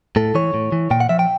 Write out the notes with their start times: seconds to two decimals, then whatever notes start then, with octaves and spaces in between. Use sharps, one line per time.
0.16 A2 A4
0.35 E3 C#5
0.54 A2
0.72 E3
0.91 A#2 G5
1.00 F#5
1.09 F3 E5
1.19 G5